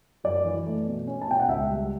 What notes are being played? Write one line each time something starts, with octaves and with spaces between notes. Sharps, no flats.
F#2 D5
E3
A3
B2
C#4
A5
B2 G5
F#5
C#2 E5
G3